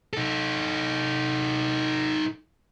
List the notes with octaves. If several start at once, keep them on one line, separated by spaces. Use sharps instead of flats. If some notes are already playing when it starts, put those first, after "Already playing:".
D#4 A4